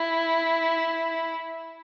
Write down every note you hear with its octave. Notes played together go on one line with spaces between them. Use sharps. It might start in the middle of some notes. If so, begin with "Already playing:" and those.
Already playing: E4